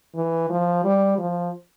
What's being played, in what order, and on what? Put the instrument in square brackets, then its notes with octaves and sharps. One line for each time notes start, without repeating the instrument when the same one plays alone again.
[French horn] E3
F3
G3
F3